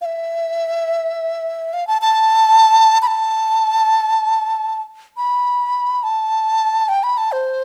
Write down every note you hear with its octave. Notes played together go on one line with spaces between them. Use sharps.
F5
E5
F5
A5
A5
B5
A5
B5
A5
G5
B5
A5
C5